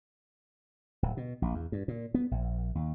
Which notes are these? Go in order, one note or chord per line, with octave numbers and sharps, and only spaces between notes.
D1
B2
A#1
E2
G2
A#2
B3
A#1
D#2